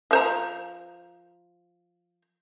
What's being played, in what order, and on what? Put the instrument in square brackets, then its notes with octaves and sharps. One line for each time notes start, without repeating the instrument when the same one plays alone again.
[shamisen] F3 C5 A#5